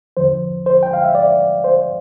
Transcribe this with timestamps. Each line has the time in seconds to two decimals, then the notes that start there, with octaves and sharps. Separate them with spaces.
0.17 E2 D3 F3 C5
0.66 C5
0.83 G5
0.93 F5
1.04 E5
1.15 D5
1.64 C5